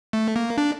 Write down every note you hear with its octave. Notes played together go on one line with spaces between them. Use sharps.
A3
A#3
D4